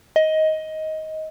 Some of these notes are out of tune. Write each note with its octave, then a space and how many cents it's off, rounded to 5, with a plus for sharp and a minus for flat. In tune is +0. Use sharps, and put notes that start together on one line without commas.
D#5 +15